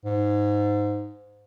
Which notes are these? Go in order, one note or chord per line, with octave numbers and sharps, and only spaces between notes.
G#2